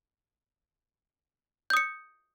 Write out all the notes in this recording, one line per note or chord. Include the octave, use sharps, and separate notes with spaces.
D#6 G6 C#7